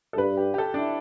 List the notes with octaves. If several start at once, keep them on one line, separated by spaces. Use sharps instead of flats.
A4
G2 B4
G4
G4
A4
D4
E4